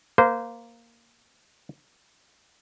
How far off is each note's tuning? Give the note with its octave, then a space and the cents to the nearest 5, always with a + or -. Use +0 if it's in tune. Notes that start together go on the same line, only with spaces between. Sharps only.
A#3 +0 C5 -25